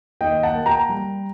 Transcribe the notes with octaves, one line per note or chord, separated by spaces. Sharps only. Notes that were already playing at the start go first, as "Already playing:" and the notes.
D#2 D#5 G5
F#5 A5
A#3
G5 A#5
G3